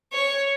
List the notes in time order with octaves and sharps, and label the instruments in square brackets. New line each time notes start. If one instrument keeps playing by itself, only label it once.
[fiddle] C#5